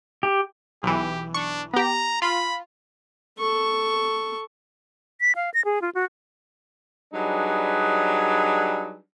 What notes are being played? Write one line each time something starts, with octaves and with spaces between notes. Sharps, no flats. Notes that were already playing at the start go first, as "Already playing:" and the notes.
G4
B1 E3 G4
D4 C#6
B3 G4 A#5
F4 B5
A4 C#6
B6
F5
A#6
G#4
F4
F#4
F#3 G3 D4 D#4 G#4 B4